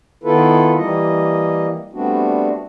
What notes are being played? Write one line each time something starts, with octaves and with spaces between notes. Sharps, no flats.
D#3 B3 E4 F4 A4 B4
E3 G3 A#3 D#5
G3 A3 B3 C4 D4 F#4